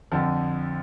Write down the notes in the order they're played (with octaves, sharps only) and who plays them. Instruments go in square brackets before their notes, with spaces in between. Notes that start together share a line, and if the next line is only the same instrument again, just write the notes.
[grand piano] F2 D3 F3